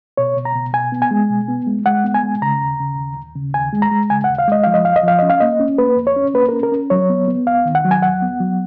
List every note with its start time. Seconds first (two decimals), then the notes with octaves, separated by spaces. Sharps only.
0.17 B2 C#5
0.36 B2
0.45 A#5
0.55 B2
0.73 B2 G#5
0.92 B3
1.02 G#5
1.11 G#3
1.30 B2
1.48 B3
1.67 G#3
1.86 G#3 F#5
2.04 B3
2.14 G#5
2.23 G#3
2.42 C#3 A#5
2.61 D#2
2.80 C#3
2.98 D#2
3.17 D#2
3.35 C#3
3.54 D#2 G#5
3.73 G#3
3.82 A#5
3.92 G#3
4.10 C#3 G#5
4.24 F#5
4.29 D#2
4.39 F5
4.48 G#3 D#5
4.64 F3 F5
4.74 D#5
4.85 F2 F5
4.96 D#5
5.03 F3 F5
5.19 C#4 D#5
5.30 F5
5.40 A#3 D#5
5.60 C#4
5.78 A#3 B4
5.97 F2
6.07 C#5
6.16 C#4
6.34 A#3 B4
6.49 C#4 A#4
6.63 A#4
6.72 C#4
6.90 F#3 C#5
7.10 B3
7.28 B3
7.47 D#2 F5
7.65 D#3
7.75 F#5
7.84 F#3
7.91 G#5
8.02 D#2 F#5
8.22 B3
8.40 F#3